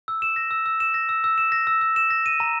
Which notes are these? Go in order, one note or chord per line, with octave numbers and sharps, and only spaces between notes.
E6
E7
A#6
E6
E6
E7
A#6
E6
E6
E7
A#6
E6
E6
E7
A#6
D#7
A#5